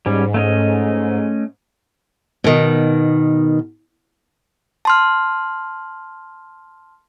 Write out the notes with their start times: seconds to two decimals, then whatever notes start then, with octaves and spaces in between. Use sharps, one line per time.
0.06 G#2 G3 C#4
0.34 A3 C#4 D#5
2.44 B2 D#3
4.85 A5 C6 F6